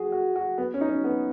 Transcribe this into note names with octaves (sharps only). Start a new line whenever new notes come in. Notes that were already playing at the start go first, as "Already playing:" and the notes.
Already playing: F#4 G#4
F#4
F#4
B3
C#4
D#4
C#4
B3